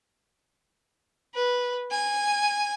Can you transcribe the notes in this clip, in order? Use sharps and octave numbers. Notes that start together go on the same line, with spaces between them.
B4
G#5